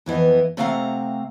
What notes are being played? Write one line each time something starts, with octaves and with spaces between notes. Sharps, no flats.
F2 E3 B3 D#5
C3 A3 C4 F5 F#5 A#5